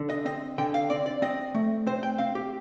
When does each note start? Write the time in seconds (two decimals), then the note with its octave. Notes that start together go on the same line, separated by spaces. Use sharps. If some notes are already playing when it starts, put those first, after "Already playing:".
Already playing: D3
0.10 D#5
0.25 C4 D#5
0.58 D3 G5
0.74 F5
0.90 C4 D5
1.06 D5
1.22 C4 D#5
1.55 A3
1.87 C4 C5
2.03 G5
2.18 C4 F5
2.35 G4